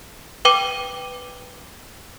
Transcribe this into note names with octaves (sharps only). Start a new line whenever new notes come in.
B4 G5 D6 D#7